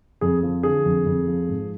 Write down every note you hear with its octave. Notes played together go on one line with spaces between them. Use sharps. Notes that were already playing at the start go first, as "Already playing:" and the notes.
F2 G#4
F3
D3 G#4
F2
F2
F3
G#2